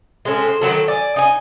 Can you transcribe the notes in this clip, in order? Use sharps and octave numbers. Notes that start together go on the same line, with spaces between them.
G#3 C4 C#4 A4
C5
D#3 F3 F#3 A4
D5 G#5
D#4 G#5